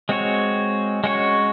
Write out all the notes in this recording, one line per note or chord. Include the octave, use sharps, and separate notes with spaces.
G#3 C4 F#4 C#5
G#3 C#4 F#4 C#5